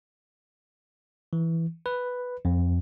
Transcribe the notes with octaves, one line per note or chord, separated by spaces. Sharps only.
E3
B4
F2